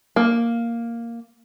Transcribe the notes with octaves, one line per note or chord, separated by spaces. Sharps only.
A#3